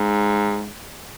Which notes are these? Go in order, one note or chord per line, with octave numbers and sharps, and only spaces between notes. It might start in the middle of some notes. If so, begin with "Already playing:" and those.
Already playing: G#2